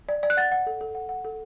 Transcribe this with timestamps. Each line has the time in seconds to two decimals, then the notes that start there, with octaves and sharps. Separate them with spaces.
0.09 D5
0.23 D5
0.30 F#6
0.37 F#5 A6
0.52 F#5
0.67 A4
0.81 A4
0.95 F#5
1.09 F#5
1.25 A4